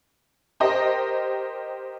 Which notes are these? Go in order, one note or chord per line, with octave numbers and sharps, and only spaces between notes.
G4 A#4 C5 D#5